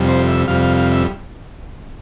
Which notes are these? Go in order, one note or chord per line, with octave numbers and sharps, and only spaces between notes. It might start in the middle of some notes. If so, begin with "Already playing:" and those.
Already playing: F2 C3 G3
C5
E5
F2 C3 G3 F5
F5
F5
E5